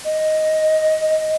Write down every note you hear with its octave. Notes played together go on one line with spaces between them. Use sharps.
D#5